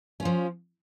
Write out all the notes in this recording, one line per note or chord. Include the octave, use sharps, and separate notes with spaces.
F3 C#4 F4